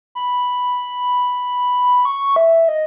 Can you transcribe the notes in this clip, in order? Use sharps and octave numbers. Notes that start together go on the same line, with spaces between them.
B5
C#6
E5
D#5